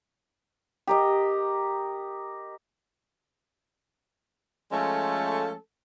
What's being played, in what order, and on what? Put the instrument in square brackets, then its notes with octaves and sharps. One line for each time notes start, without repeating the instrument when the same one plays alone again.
[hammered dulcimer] G4 A#4 D#5
[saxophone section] F3 G#3 A3 C#4 A4